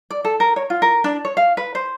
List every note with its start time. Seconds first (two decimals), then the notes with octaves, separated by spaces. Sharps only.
0.10 D5
0.25 A4
0.40 A#4
0.56 C#5
0.70 F4
0.82 A#4
1.04 D4
1.25 C#5
1.37 F5
1.57 B4
1.75 C5